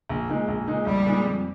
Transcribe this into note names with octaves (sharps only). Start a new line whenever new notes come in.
A#1
A#2 G#3 D#4
A#1
A#2 G#3 D#4
A#1 G3
A#2 G#3 D#4
F2